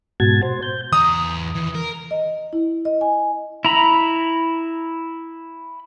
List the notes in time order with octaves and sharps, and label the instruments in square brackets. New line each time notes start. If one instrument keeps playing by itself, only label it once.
[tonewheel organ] G#2 B2 F#4 A5 G#6
C5
G6
[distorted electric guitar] E2 A#5 [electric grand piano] D#6
[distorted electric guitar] D#2 E3
A#4
[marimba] D#5
E4
D#5
G#5
[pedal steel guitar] E4 A#5 B5